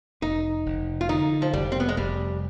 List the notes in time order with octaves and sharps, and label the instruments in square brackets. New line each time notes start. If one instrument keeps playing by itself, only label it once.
[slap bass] F1 [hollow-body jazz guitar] D#4
[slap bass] F1
[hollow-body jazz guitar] F4
[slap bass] D3 [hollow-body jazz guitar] D#4
[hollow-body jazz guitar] F3
[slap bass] F1 [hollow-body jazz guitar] G3
[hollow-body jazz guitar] C4
B3
G#3
[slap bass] F1 [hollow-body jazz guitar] G3